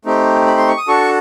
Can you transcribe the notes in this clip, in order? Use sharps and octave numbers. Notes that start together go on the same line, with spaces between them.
A3 C4 D#4 G4
B5
C6
C#6
D#6
D4 F#4 A4 C#6